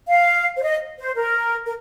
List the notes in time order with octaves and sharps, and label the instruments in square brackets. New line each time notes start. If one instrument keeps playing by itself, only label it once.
[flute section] F5
C5
D#5
C5
A#4
A#4